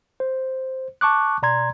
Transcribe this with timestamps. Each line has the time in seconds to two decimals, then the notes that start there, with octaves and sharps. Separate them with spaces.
0.20 C5
1.01 A5 C#6 D6 F#6
1.42 B2 D5 A#5 C6 G#6